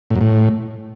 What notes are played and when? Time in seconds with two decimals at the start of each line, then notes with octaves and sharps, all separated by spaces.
0.10 A2
0.16 F#2
0.21 A2